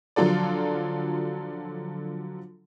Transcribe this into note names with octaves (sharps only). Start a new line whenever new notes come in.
D3 F3 F#3 F4 A4 D5